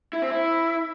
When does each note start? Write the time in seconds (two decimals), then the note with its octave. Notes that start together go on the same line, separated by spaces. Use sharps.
0.13 E4
0.22 C4
0.31 E4